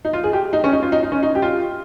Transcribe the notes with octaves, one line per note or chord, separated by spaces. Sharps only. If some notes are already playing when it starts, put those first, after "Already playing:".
D#4
F4
G#4
G4
D#4
C#4
D#4
F4
D#4
D#4
C#4
D#4
G4
F4